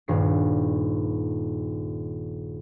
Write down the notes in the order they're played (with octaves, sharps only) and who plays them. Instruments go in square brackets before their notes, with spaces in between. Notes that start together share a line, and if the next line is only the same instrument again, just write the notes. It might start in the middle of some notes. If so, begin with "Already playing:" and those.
[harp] D#1 G2 C7